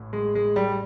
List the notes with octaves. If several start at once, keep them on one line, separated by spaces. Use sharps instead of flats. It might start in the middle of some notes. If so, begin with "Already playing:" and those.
Already playing: A1 A2
G#3
G#3
G3